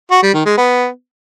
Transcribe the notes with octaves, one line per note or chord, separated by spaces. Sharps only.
F#4
G3
D#3
G#3
B3